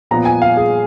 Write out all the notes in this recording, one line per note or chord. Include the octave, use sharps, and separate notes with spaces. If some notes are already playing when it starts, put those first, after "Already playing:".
A#2 F3 B3 F4 A#5
G#5
F5
G#4